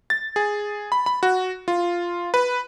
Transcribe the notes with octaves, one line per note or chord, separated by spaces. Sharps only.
A6
G#4
B5
B5
F#4
F4
B4